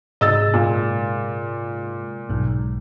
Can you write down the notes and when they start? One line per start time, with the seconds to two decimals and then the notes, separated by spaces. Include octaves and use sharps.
0.21 G#2 C3 G#3 D#5 E6 A6
0.54 A#2
2.29 B1 G#2